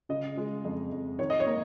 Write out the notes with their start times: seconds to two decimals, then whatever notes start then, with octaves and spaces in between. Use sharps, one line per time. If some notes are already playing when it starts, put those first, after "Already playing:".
0.09 C#3 D#5
0.37 G#3
0.64 F2
0.92 F2
1.19 D#3 C#5
1.30 D#5
1.40 C#5
1.46 A#3